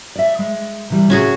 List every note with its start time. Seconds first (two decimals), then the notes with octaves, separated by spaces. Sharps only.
0.16 D5 E5
0.39 G#3
0.90 C3 E3 G3
1.10 A2 C3 C#4 F#4 G#4